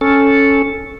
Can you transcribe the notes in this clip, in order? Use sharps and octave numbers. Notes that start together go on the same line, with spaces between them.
C#4 A4